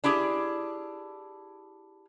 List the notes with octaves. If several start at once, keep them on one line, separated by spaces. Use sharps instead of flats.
D4 E4 G4 G#4